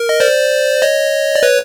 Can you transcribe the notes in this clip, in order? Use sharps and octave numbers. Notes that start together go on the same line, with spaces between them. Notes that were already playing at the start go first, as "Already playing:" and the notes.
Already playing: A#4
D#5
C5 D5
C#5 D#5
D5
B4 C#5